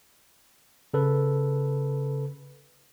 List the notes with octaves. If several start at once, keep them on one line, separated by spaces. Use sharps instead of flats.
C#3 A4 B4